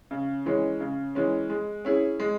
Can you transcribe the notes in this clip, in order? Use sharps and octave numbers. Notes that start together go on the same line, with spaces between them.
C#3
E3 G#3 C#4
C#3
E3 G#3 C#4
G#3
C#4 E4 G#4
G#3